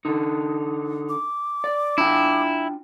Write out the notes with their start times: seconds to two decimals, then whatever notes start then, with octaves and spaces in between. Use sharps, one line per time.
0.05 D3 D#4
1.09 D6
1.64 D5
1.98 D4 E4 F4 G5